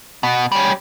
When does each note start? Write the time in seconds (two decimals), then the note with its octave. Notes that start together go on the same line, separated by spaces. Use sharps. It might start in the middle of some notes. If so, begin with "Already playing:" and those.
0.23 B2
0.52 G3 C#4